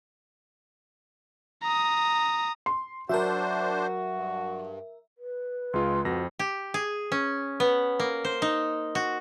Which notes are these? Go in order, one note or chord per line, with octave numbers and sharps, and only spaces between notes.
A#5 D#6
C6
F#3 D4 F#4 A#4 C5 E5
G2
B4
C#2 G#3 F4 C6
F2 C4 F#4 A#6
G4
G#4
C#4
B3
A#3
C5
D#4
F#4